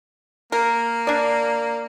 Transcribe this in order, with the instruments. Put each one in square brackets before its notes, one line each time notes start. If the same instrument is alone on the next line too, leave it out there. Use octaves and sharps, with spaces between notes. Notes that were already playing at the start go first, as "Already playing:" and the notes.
[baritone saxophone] A#3 [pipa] A#4
[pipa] D4 D5